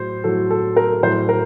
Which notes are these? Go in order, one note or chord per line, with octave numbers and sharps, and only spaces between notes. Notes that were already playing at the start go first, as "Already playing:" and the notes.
Already playing: A2 F#3 C5
A2 F#3 A4
A4
A#4
A2 F#3 C5
A#4